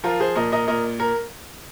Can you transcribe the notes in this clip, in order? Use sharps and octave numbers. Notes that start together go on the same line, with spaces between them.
F3 F4 A#4
G#4 C5
A#2 A#4 D#5
A#4 D#5
A#2 A#4 D#5
A#4